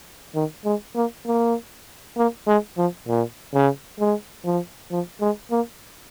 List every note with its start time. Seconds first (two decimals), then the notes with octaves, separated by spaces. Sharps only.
0.35 D#3
0.65 G#3
0.96 A#3
1.27 A#3
2.17 A#3
2.47 G#3
2.77 F3
3.08 A#2
3.54 C#3
3.99 G#3
4.45 F3
4.91 F3
5.21 G#3
5.51 A#3